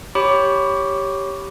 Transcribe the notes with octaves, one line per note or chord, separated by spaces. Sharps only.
G4 C#5 B5 D6